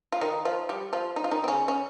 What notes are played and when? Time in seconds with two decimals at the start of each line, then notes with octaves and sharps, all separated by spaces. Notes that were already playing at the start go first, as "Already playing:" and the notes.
0.12 F4
0.21 D#3 D#4
0.45 F3 F4
0.69 G3 G4
0.93 F3 F4
1.16 D#4
1.24 F4
1.31 D#3 D#4
1.44 C4
1.48 C#3 C#4
1.68 C#4